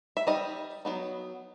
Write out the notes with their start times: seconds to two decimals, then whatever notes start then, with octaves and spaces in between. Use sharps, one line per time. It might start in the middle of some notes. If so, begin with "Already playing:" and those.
0.17 E5
0.27 G3 D#4 D#5
0.85 F#3 B3 D#4